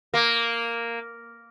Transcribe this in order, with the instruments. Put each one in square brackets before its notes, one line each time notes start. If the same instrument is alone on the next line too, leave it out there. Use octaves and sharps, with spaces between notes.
[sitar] A#3